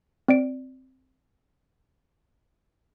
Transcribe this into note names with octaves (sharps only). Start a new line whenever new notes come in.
C4 D5 D7